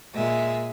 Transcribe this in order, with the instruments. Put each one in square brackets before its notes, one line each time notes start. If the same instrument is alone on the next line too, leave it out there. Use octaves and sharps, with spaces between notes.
[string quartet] A#2 G#3 E5